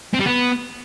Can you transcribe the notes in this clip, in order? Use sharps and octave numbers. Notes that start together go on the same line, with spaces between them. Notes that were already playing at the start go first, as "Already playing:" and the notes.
C4
G3
B3